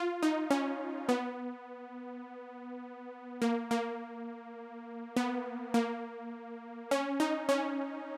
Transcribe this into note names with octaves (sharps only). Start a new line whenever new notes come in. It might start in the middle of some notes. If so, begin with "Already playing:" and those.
Already playing: F4
D#4
C#4
B3
A#3
A#3
B3
A#3
C#4
D#4
C#4